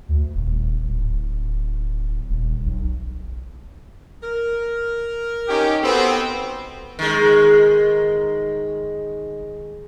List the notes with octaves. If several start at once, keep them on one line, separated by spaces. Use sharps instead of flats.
D2
D#1
D1
D#1
B1
A#4
C#4 D#4 G4
B3 C4 F#4 A4
D#3 G#3